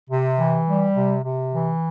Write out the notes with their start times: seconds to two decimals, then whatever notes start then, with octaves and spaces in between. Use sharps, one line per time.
0.10 C3
0.38 E3
0.67 G3
0.96 C3
1.24 C3
1.52 E3